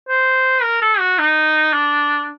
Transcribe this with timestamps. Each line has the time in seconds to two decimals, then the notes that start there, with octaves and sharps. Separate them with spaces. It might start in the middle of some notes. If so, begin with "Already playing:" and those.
0.09 C5
0.63 A#4
0.82 A4
0.99 F#4
1.19 D#4
1.73 D4